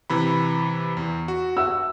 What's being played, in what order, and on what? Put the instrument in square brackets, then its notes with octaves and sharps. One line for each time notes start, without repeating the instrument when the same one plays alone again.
[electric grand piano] C3 E3 B5
E2
F#4
[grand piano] E5 F#5 E6